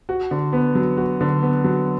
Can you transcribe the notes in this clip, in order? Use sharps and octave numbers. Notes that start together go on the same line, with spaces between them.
F#4
D3
B3
F#3
F#4
D3
B3
F#3